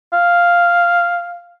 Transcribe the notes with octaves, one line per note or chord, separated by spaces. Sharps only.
F5